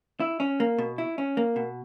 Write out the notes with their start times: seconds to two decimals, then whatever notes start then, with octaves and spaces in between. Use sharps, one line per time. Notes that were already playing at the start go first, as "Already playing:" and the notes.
0.20 E4
0.40 C#4
0.60 A#3
0.78 B2
0.98 E4
1.18 C#4
1.37 A#3
1.56 B2